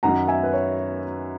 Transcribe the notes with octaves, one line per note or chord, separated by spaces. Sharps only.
F#2 D#3 F#3 F#5 A#5
E5 G#5
B4
C#5